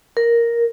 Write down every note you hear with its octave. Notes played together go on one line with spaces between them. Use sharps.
A#4